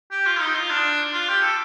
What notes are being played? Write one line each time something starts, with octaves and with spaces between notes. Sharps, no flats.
G4
F4
D#4
F4
D4
F4
G4
A4